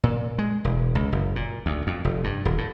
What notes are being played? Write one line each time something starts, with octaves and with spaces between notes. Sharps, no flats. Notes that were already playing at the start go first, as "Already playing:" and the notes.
A#2
G#3
E1
C#2
F#1
A#2
D2
F2
F1
G2
D#1
A2